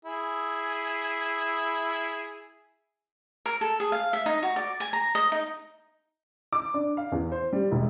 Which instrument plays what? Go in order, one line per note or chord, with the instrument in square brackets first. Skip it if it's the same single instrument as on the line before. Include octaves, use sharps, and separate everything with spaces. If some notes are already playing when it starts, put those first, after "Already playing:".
[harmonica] E4 G#4
[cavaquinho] A#4
A4
G#4
F5
E5
D#4
F#4
D5
G#5
A#5
D#5
D#4
[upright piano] D6
D4
F5
E2
C5
G3
E1